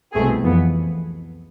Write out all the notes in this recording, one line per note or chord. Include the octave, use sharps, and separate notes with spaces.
C2 B2 A3 C4 G#4
F2 E3 B3